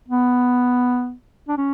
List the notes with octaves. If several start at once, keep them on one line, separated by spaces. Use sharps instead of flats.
B3
D4
C#4